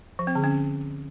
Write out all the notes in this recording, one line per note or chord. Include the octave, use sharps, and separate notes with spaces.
F3
C4
D3
C#4